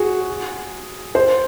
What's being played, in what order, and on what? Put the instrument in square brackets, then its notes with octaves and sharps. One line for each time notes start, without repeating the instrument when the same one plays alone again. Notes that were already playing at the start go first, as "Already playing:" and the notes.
Already playing: [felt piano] F#4 G#4
C5